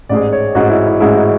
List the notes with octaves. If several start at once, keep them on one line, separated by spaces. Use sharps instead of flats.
A1 G#2 G#3 D5
C#5
A1 G#2 G#3 F#4
E4
E4
A1 G#2 G#3 E4
F#4